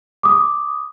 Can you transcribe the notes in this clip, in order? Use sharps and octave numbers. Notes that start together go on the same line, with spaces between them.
D6 D#6